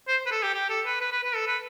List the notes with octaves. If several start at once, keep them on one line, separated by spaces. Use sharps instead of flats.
C5
B4
A4
G4
G4
A4
B4
B4
B4
B4
A4
B4